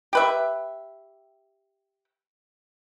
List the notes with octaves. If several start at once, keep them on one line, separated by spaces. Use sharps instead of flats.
G4 B4 E5